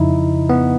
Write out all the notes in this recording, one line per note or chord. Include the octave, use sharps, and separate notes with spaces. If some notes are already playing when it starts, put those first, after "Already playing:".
Already playing: F2 C#3 F3 D#4 E4
B3